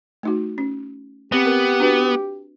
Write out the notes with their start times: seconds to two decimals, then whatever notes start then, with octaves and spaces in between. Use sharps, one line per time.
0.23 A3 D#4 F#4
0.58 C#4
1.32 B3 C4 G4
1.46 C4 A#4
1.80 D4 F#4 B4